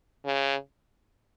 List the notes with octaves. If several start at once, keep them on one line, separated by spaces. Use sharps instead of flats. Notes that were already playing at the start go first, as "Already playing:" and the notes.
C#3